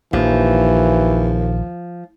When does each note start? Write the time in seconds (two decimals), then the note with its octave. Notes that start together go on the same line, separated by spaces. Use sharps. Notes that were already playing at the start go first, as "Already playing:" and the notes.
0.13 A#1 D#2 E3 F3